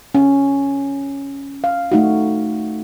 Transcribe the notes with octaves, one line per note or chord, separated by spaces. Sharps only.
C#4
F5
A3 D#4 F#4